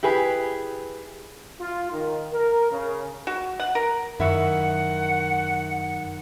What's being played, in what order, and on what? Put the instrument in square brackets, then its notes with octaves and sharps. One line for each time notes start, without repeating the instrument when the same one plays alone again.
[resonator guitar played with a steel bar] E4 G4 G#4 B4
[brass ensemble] F4
D#3
A#4
C#3
[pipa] F#4
F#5
A#4
[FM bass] F#2 [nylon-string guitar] D#3 [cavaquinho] E4 E5 C#6 [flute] F#5